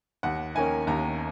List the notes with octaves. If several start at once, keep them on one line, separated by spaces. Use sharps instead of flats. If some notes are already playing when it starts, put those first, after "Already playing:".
D#2 F#5
D#3 A#3 C#4 G#5
D#2 A#5